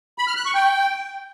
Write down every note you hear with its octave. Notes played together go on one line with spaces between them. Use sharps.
B5
F6
F#6
C#6
G5